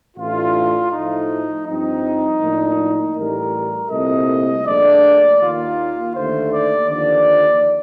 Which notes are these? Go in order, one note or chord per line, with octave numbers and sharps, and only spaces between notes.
A1 A2 A3 D4 F4
A2 F3 A3 D#4
G2 F3 C4 D#4
A2 F3 A#3 D4
A1 A2 G3 A#4
C2 A#2 A3 C4 D#5
A#1 A#2 A3 D4 D5
D#2 D#3 A#3 F4
D#2 D3 A3 C5
D5
D#2 D3 F3 D5